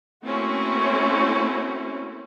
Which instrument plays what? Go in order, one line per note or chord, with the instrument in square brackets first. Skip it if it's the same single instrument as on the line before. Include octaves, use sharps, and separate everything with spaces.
[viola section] A3 A#3 C4 C#4 E4 F#4